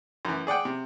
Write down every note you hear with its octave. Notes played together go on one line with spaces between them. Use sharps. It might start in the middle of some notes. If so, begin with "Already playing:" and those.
F#2 E3
G#4 D5 F#5 G5
C3